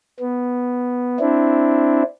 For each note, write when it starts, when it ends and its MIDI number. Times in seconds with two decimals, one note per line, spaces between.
0.20 1.18 59
1.20 2.03 60
1.20 2.03 62
1.20 2.03 64